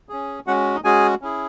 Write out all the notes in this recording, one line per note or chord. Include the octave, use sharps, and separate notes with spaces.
C#4 G#4
G#3 C#4 F#4 F#5
D#4 D#5
G#3 C#4 F#4 G#4 G#5
C#4 E4 G#4